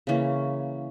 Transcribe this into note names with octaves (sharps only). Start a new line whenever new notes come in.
C#3 E3 A#3 C#4